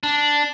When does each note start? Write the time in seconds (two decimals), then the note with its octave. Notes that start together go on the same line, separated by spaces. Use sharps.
0.03 D4